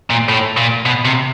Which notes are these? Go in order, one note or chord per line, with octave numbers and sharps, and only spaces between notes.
A#2
A2
A#2
B2
C3